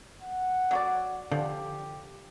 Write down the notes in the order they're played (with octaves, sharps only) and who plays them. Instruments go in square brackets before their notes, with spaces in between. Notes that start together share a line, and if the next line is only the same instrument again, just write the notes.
[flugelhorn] F#5
[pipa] F#3 F#4 D5
[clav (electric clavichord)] D3 [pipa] F3 [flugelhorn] G4